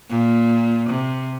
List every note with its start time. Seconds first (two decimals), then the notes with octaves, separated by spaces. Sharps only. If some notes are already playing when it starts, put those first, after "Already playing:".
0.10 A#2
0.90 C3